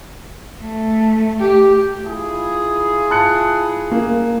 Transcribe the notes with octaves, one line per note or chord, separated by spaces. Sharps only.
A3
G4
E4 F4 G#4
A5 F#6 C#7
A#3